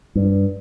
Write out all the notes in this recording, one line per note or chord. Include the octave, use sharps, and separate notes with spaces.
G2